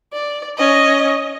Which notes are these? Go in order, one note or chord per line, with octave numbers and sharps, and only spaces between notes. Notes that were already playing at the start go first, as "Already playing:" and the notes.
D5
C#4 D#5